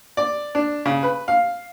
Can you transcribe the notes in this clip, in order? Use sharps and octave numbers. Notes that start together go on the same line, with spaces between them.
D5
D4
C#3
B4
F5